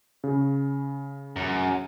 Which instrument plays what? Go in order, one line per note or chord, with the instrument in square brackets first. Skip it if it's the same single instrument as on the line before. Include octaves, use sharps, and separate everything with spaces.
[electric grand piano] C#3
[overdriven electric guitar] F#2